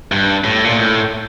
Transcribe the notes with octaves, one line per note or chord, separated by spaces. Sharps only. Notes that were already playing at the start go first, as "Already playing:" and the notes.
G2
A2
A#2
A2